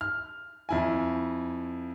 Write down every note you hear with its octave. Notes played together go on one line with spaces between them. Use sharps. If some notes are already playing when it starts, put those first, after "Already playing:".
F6
F2 E4 G#5